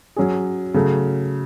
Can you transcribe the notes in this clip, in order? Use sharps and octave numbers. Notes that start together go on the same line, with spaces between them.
F#3 C#4 G#4
C#3 F#3 A3